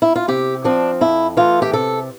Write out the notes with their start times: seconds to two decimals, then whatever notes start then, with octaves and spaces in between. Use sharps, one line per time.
0.02 E4
0.16 F4
0.28 C3 G4
0.64 F3 C4 D4
1.01 F2 E4
1.37 E3 A3 F4
1.62 G4
1.73 C3 A4